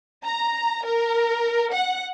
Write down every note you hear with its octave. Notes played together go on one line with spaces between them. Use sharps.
A#5
A#4
F#5